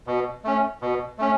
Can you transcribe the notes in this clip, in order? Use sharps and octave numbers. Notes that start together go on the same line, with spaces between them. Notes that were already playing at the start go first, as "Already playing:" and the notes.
B2
A3 C#4
B2
A3 C#4